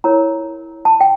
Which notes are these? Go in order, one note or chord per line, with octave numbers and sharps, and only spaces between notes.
E4 A#4 C#5 A#5
A5
G5